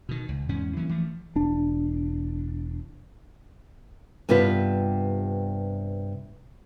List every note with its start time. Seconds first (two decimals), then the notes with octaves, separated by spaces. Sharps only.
0.09 B2 D#3
0.29 C#2
0.49 E2 G#2 C#4
0.76 E3 F#3 A#3 C#4
0.89 E3 F3 A3
1.35 E1 D4
4.29 G2 C3 B3 F4 B4